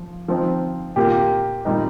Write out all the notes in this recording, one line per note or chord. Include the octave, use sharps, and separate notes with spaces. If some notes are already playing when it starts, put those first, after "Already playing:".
Already playing: F3
F3 C4 D#4
A#2 A#3 F4 G4
A#2 G3 D#4